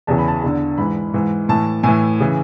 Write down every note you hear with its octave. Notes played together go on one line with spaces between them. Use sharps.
E2 C#3 E3 A5
B5
A5
E2 D3
G#2 E3 B5
G#2 E3
A2 E3 A5
A2 E3 G#5
C#3 E3